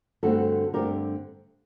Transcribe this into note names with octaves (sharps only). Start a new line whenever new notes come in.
G2 D3 A3 C4 F#4 A4
G2 D3 A3 C4 G4 A#4